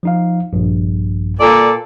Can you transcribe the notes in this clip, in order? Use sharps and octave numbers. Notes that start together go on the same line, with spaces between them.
F3 D#4 F5
A#1 G2
A#2 A4 D5